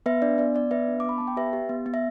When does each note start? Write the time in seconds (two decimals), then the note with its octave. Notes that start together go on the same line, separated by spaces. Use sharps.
0.06 B3 B4 E5
0.22 D4 D5
0.38 B3 D5
0.55 B3 D5
0.71 B3 B4 E5
0.88 D4
1.00 D6
1.04 B3 B5
1.18 B3 A5
1.28 G5
1.37 G4 B4 E5
1.53 G4
1.69 B3
1.86 B3
1.94 E5